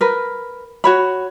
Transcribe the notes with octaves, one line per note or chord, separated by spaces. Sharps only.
A#4 B4
F#4 C#5 B5